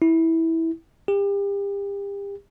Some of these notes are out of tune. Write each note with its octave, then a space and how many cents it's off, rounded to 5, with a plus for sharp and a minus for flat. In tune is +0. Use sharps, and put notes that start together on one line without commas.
E4 -15
G4 +35